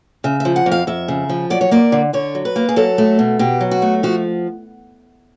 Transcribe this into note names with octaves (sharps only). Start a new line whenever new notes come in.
C#3 E5
F3 E5
F#5
F2
F5
F2 E5
C#3
F3
F#3 D5
C#5
A#3 D5
D3
D3 C#5
F#3
B4
A#3
G#4
F#3 A4
A3
B2
B2 G4
F#3
F#4
A3
F3 F#4